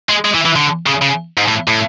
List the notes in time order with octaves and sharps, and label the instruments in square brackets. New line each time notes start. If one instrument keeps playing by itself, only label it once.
[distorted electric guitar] G#3
G#3
E3
E3
D3
C#3
C#3
G#2
A2
A2